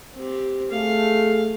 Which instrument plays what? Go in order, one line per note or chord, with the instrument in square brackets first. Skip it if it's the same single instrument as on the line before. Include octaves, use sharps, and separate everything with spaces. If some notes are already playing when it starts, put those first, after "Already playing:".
[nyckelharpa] C4 G4
[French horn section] A3 G#4 [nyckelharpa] F5